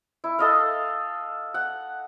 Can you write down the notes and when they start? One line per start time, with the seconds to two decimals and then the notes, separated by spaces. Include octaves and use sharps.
0.24 E4
0.39 A4 D#5 F5
1.54 F#5